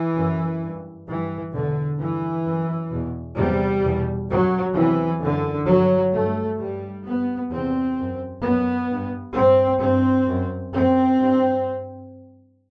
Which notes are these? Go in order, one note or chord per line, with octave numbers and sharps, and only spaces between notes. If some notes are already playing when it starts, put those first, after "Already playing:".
Already playing: E3
F#2
G2
G2 E3
E2 B2 D3
G2 E3
F#2
E2 B2
E2 C3 G3
E2 B2
F#2 F#3
E2 C3 E3
F#2 D3
G2 F#3
G2 A3
G2 G3
G2 B3
E2 C3 C4
F#2
F#2 B3
G2
G2 C4
G2 C4
F#2
F#2 C4
G2